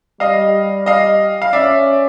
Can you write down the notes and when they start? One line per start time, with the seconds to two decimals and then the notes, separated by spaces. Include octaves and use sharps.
0.20 G3 D#5 F5
0.86 D#5 F5
1.42 F5
1.53 C#4 D5 E5